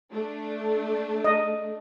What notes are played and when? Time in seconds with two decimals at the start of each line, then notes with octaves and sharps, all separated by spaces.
0.12 A3 D4
1.24 D#5